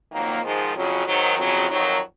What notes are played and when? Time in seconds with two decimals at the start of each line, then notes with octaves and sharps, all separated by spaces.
0.12 F2 D#3 F#3 A#3
0.44 G#2 D#3 F3 G#3
0.75 F2 C#3 F#3
1.06 G#2 D#3 F#3
1.37 F2 C#3 F#3
1.69 F2 D#3 F#3